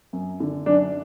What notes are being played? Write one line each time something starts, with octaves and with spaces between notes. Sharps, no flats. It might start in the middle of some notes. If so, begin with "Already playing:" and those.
F#2
D3
F#2 D4